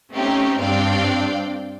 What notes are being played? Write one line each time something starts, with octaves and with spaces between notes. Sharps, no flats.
A3 C4 C#4 D#4 G4
G2 C4 D4 D5 F5 G5